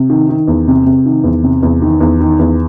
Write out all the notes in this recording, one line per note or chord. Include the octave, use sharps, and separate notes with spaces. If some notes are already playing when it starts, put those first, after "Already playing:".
Already playing: C3
D#3
D#3
E2
C3
C3
D#3
E2
C3
E2
D#3
E2
D#3
E2